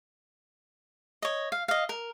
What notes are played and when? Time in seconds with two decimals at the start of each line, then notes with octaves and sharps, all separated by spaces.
1.22 C#5 D#5
1.52 F5
1.68 D#5 F5
1.89 A#4